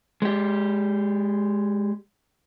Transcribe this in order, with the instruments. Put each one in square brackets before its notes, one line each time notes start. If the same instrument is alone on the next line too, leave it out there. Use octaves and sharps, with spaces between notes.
[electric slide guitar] G#3 G4